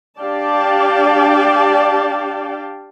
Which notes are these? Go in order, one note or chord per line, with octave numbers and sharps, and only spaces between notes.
D4 G4 D5 F5 G5 A5